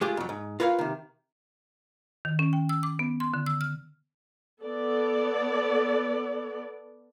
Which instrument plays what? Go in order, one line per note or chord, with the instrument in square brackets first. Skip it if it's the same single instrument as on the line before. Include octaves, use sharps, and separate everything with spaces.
[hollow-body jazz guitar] G#3 A3 F4 G4 G#4
F2 F#3
G#2
F4 A#4 B4 C#5 D#5 F5
C3 D#3
[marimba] D#3
C#4
G5
E6
D6
B3
C6
D3
E6
F6
[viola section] B3 A4 D5